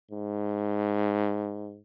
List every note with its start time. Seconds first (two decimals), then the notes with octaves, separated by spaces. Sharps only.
0.11 G#2